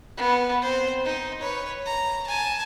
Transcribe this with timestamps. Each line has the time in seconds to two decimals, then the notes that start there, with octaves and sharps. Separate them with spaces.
0.17 B3
0.62 C4 C5
1.05 D#4
1.40 B4 C#5
1.86 A#5
2.27 G#5 A5